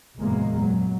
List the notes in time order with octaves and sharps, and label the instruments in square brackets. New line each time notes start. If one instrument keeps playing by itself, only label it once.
[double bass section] F#1 E2 A#2 G#3 A#3
F#3